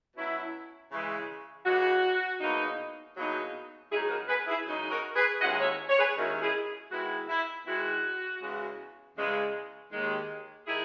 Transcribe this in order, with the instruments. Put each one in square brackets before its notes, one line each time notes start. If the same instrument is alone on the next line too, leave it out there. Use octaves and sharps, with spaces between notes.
[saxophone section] B2 F#3 C#4 E4
C#3 E3 G#3
C#3 E3 G#3 F#4
E2 B2 F#3 A#3 D#4
E2 B2 F#3 A#3 D#4
F#2 C#3 G#3 D#4 E4 G#4
B4
F#4 A#4
G#4 B4
E4 G#4
F#2 C#3 G#3 D#4
F#4 A#4
G#4 B4
D#2 D#3 G#3 C#4 E4 D#5 F#5
C#5 E5
C#5
G#4 B4
D#2 D#3 G#3 C#4 E4 F#4 A#4
E4 G#4
D#3 G#3 B3 E4 F#4
E4
D#3 G#3 B3 E4 F#4
E2 C#3 G#3
E2 C#3 G#3
D#2 D#3 G#3
D#3 G#3 E4 G#4